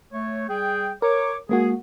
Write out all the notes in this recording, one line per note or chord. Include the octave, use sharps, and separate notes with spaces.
A3 C#5
G3 G#4 G5
A#4 C#5 D6
G#3 A#3 F#4 G#4